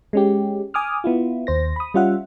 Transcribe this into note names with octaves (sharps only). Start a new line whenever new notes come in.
G#3 C#4 G4
G#5 D6 D#6 F6
B3 E4 F4
D#2 C5 A#6
B5 D#6
G3 C#4 F4 E5 F#5